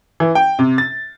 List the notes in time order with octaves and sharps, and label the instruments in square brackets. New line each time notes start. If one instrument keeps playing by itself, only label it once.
[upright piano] E3
G5
C3
A6